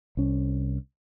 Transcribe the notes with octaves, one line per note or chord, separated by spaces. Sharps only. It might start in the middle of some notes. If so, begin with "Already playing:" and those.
C2 C#4